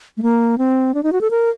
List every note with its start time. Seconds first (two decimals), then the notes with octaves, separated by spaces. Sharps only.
0.17 A3
0.22 A#3
0.58 C4
0.94 D4
1.03 D#4
1.12 F#4
1.21 A4
1.31 A#4